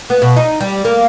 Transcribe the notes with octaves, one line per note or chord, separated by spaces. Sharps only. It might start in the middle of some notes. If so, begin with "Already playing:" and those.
B3
B2
D#4
G3
A#3